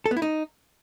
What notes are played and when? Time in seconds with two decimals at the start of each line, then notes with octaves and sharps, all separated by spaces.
0.06 A4
0.11 B3
0.17 E4
0.22 D#4